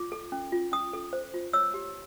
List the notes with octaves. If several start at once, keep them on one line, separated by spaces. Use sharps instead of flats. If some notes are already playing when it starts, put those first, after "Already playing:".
Already playing: F4 D6
A4
C#4
F4
C#4 D#6
A4
C5
F4
C#5 E6
G4